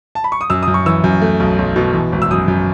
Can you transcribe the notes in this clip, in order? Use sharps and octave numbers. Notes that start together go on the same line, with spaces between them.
A5
B5
C#6
D#6
F#2 E6
D#6
F#2
C#6
E3 E6
F#2
A3
B1
B1
B2
E3
G#1
E6
F#2 D#6
F#2